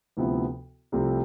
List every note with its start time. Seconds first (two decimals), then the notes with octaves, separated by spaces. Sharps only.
0.17 D2 C3 F3 B3 E4
0.92 C2 C3 F3 A3 C4